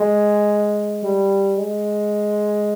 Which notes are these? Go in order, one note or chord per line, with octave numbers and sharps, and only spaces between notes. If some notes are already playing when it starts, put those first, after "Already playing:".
Already playing: G#3
G3
G#3